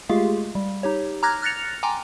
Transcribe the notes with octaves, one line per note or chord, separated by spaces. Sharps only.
G#3 A3 F4 G4 G#4 F5
G3
D#4 G4 C#5
A#5 D6 F6 F#6 G#6 A#6
F6 F#6 A6 A#6 C#7 F7
G5 G#5 A#5 C6 D6